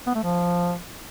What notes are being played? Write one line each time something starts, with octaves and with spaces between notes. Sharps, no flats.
B3
A3
F3